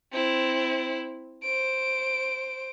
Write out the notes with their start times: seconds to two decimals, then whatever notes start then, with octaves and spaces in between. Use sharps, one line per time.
0.13 C4 E4
1.43 C5 D7